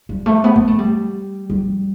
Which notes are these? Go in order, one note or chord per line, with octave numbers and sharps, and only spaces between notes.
G3
A3
B3
B3
A3
G3
G3